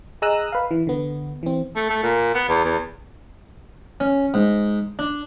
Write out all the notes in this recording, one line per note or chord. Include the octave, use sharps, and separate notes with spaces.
G#4 D#5 A#5 D#6 E6 F#6
B4 F5
E3
D3 B3
E3 C4
A3
A3
A#2
B3
E2
E2
C#4
G#2
D4